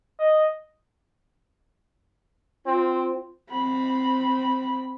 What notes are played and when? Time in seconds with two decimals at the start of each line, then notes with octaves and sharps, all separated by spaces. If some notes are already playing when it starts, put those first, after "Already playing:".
0.19 D#5
2.66 C4 F4
3.50 C4 B5